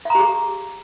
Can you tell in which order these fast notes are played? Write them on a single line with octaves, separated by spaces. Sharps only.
F5 A#5 G4 G#4